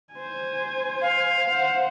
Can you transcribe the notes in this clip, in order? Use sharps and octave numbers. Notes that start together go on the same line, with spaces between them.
C5 G#5
F5
C5 F#5